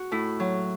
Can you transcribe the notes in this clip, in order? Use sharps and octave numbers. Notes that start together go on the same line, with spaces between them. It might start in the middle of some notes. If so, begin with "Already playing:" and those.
Already playing: F#4
A2 E4
F#3